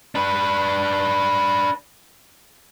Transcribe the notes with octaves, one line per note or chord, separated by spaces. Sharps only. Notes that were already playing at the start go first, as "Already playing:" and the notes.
D4 B4